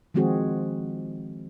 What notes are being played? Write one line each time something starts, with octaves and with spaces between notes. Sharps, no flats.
D#3 F3 G#3 C4 F#4 G#4